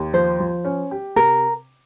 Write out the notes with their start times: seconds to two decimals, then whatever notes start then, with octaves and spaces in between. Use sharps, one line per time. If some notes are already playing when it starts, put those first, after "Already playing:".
Already playing: D#2
0.13 F3 C5
0.40 F3
0.65 C#4
0.91 G4
1.16 C3 A#4